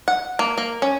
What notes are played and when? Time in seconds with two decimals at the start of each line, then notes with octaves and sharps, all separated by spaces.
0.08 F#5
0.39 A#3
0.58 A#3
0.82 C#4